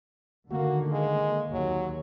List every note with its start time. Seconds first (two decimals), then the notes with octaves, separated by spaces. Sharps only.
0.51 D3 D#3 A#3 F#4
0.92 G#3
1.52 D#2 F#3